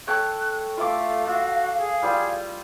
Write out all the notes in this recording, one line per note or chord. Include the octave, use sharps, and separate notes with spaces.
A4 C#5 G5 F#6
A3 F4 E5 F5 D6
F#4 E5
G#4
G3 F4